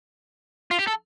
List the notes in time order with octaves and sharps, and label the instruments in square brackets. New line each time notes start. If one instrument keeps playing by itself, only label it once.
[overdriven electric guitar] F4
G4
A4